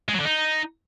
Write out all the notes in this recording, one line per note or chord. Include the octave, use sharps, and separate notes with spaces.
G#3
F#3
D3
D#4